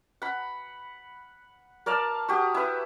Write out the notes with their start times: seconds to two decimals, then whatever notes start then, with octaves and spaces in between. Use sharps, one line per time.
0.22 F#5 B5
1.86 A#4 D5 F5 A5
2.28 F#4 G4 D#6
2.54 E4 B4